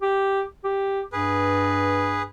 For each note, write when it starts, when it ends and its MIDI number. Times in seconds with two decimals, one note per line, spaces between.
0.02 0.43 67
0.64 1.01 67
1.13 2.28 43
1.13 2.22 68
1.13 2.22 71